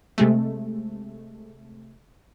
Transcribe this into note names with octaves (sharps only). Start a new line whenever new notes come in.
C3 G#3 A3